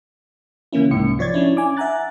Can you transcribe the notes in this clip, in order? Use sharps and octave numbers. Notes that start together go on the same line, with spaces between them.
C#3 E3 A#3 C#4 E4
C2 G#2 C#7
F3 C#5 D5 G#6 A6
C#4 D4 E4
G#5 D6
E5 F#5 G#5 A#5 F#6 A6